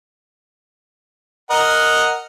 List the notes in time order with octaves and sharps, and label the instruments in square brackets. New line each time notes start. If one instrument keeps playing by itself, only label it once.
[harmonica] A#4 D#5 F#5